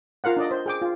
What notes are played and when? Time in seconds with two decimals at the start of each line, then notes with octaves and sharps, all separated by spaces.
0.24 F4 A#4 F5 F#5
0.37 D4 D5 D#5
0.51 C5
0.66 G#4 G5 D6
0.82 F4